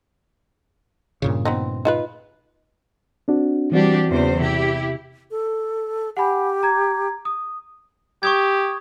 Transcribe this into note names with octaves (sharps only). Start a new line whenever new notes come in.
G2 A#2 C#3
B3 C4 D#4
D#4 F4 B4
C4 D4 F#4
E3 G3 C4 D4 F#4 G4
E2 C#3 C5
C3 E4 G4
A4
G4 F#5 G#5 B5
A#5 G#6
D#6
G4 C#6 D#6 G#6